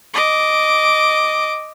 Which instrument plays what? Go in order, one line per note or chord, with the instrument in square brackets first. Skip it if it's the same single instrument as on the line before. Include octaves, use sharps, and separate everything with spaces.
[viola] D#5 D6